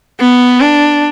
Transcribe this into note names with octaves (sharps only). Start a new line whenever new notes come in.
B3
D4